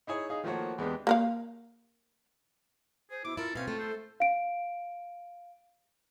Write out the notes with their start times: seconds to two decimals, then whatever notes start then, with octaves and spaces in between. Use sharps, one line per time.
0.07 D#4 E4 G#4 C#5
0.29 D#4 G#4 F5
0.43 D#3 F3 A3 A#3 F#4 C#5
0.78 E2 G#3 B3 D4 G4
1.07 A#3 A#4 F5
3.11 G#4 C5
3.25 B2 E4 D6
3.37 E4 F4 A4 A#4
3.55 B2 C4 C#4 F5
3.68 A3 F4
3.79 A4 C5
4.20 F5 D7